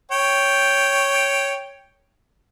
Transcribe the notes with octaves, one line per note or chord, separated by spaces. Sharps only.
C#5 G5